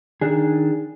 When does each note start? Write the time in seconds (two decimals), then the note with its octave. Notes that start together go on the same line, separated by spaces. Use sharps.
0.21 D#3 D4 G#4